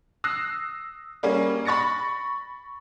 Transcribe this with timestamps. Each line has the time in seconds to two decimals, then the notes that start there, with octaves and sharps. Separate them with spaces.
0.24 D#6 E6 F#6 A#6 C7
1.23 G3 A#3 C#4 G#4
1.65 B5 C#6 A6 A#6 C#7